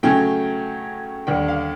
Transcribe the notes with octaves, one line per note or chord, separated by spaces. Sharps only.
C#3 F#3 A3 C#4 G5
D#2 D3 G3 G5
F5